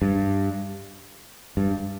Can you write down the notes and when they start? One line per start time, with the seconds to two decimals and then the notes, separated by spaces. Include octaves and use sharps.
0.02 G2
1.57 G2